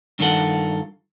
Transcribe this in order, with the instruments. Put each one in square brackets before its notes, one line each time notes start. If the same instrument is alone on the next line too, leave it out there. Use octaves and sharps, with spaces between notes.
[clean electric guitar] G2 D#3 D4 F4 A4 F#5